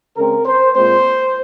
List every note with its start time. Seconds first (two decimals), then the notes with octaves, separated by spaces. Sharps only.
0.17 C#3 G#3 C4 A#4
0.45 C5
0.75 A#2 G#3 C4 C5